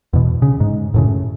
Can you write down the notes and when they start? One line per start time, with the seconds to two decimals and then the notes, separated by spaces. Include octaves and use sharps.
0.13 E2 B2
0.42 C#3
0.60 G#2
0.94 F#2 A2 C#3